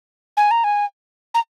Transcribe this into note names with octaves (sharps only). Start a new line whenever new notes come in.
G#5
A#5
G#5
A#5